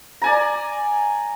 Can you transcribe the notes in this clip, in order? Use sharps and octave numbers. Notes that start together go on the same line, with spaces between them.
D5 G#5 A#5